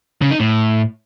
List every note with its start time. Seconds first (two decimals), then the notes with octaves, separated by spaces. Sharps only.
0.22 C#3
0.31 D#4
0.40 A2